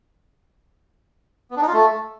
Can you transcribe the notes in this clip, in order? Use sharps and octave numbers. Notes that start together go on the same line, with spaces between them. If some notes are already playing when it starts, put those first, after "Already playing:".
B3
D4
D#4
F4
A3